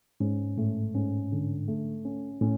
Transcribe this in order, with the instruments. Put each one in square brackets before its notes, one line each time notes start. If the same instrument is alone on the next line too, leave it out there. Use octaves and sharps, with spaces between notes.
[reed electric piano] G#2 [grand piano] C#4
[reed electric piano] A2 [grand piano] A3
[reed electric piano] G#2 [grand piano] C#4
[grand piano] D3
A3
C#4
[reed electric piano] A2 [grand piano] C#4